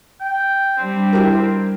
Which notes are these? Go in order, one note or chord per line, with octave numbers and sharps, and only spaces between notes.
G5
G3 C4 D4
E4 G4 A#4